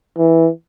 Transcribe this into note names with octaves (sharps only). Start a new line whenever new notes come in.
E3